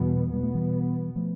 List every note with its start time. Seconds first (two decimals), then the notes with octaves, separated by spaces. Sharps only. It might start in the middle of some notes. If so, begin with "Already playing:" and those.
Already playing: E2 B2 E3 G3 B3
0.33 B2 G3 B3
0.43 A3
0.55 E3 G3
1.16 F3 A3